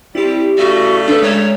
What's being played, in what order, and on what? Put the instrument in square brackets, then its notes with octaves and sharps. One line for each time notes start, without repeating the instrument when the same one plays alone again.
[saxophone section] G3 C4 [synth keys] E4 G4
[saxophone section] C#3 G3 A3 [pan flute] F#4
[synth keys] D4 B4 [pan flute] A4
[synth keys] G#3 A#5 E7 [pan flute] C#5